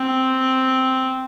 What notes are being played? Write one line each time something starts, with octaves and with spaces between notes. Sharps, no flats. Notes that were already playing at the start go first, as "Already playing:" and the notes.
Already playing: C4